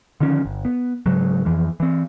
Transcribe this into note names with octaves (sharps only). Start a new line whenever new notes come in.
D3 D#3 F3 C#4
G1
B3
G#2 C#3 F#3 G#3
F2 E3 F3
E3 C4